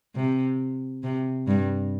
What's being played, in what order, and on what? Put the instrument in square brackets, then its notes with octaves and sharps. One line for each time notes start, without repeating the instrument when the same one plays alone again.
[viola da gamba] C3
C3
G2